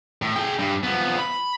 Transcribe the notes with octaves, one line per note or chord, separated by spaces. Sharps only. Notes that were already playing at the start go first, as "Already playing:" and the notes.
A2
G#4 G5
G2
F3 B3
B5